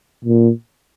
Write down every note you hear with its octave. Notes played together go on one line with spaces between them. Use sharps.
A#2